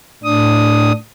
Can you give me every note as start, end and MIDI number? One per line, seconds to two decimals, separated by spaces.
0.24 0.92 45
0.24 0.92 62
0.24 0.92 87